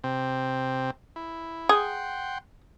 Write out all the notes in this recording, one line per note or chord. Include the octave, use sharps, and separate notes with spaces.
C3 C4
E4
G#4 F#5 G5 C6